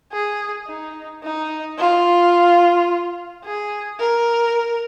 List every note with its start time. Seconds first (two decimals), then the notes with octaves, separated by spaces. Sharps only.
0.12 G#4
0.67 D#4
1.23 D#4
1.78 F4
3.44 G#4
3.99 A#4